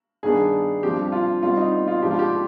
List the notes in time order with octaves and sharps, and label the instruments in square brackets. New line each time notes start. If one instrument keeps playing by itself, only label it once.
[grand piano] G2 D#3 B3 D4 G#4
G2 F3 C4 G4
F4
B2 G3 C4 F4
D#4
D#4
F4
G#2 F3 B3 D4 G4
F4
G4